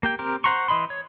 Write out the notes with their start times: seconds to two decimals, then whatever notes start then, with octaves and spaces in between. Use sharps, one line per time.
0.03 A#3 G4 G5
0.19 C4 G4 A#4
0.44 C5 F#5 A#5 C6 C#6
0.68 E3 D#5 B5 C6
0.90 C#5